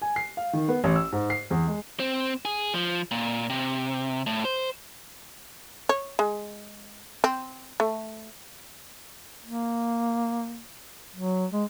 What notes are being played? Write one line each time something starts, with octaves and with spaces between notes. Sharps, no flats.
G#5
C7
F5
D#3
B3
A1
E6
G#2
C7
E2
G#3
C4
G#4
F3
A#2
C3
A2
C5
C#5
G#3
C4
A3
A#3
F#3
G#3